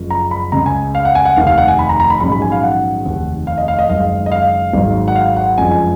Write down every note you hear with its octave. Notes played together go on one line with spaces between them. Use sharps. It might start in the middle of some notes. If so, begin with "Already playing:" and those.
Already playing: F#1 F#2 F3
A#5
B5
C#2 C#3 G#3 A#5
G#5
F5
F#5
G#5
F#5
F1 D#2 D#3 F5
F5
F#5
G#5
B5
A#5
A#5
B5
A#1 G#2 D#3 F#3 C#4 B5
B5
G#5
F5
F#5
F1 D#2 D#3
F5
D#5
F5
D#5
F#1 F#2 D#3 G#3 F5
D#5
F5
G#1 G#2 F#3
F#5
F5
F#5
F#1 F2 F3 G#3 C#4 G#5
G#5